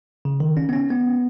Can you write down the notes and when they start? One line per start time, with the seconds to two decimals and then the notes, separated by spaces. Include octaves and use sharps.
0.25 C#3
0.40 D#3
0.57 C#4
0.69 B3
0.73 C#4
0.90 B3